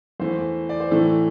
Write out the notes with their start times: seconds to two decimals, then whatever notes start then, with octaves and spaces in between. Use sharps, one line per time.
0.20 E2 E3 A3 C5
0.69 D5
0.80 C5
0.90 A2 E3 A3 A4